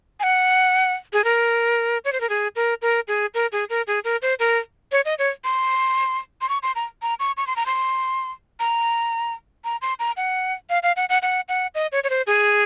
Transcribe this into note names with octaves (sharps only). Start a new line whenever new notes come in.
G#5
F#5
G#4
A#4
C#5
C5
A#4
G#4
A#4
A#4
G#4
A#4
G#4
A#4
G#4
A#4
C5
A#4
C#5
D#5
C#5
C6
C6
C#6
C6
A#5
A#5
C#6
C#6
C6
A#5
C6
A#5
A#5
C6
A#5
F#5
F5
F5
F#5
F#5
F#5
F#5
D#5
C#5
C#5
C5
G#4